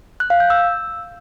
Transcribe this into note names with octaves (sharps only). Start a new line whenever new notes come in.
F#6
F5
G6
E6